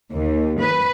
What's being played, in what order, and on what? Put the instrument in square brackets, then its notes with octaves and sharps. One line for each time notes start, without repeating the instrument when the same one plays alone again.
[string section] D#2
B4